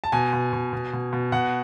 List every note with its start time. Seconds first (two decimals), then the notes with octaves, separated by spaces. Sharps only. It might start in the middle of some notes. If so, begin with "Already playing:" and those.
0.04 A5
0.12 B2 G#5
0.33 B2
0.53 B2
0.73 B2
0.93 B2
1.13 B2
1.32 B2 F#5